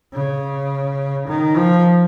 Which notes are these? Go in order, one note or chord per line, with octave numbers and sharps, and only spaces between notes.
C#3
D#3
F3